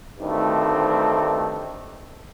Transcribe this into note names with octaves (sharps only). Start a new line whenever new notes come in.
D2 G2 D#3 A3 C4 D#4